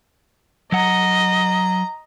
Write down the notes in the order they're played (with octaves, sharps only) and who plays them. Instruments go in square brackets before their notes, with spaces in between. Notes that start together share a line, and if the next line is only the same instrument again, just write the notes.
[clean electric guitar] F#3 F#5 [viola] D#5 [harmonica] A#5